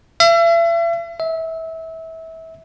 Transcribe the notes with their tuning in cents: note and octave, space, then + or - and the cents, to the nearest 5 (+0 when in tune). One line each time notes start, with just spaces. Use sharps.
E5 +40
E5 -25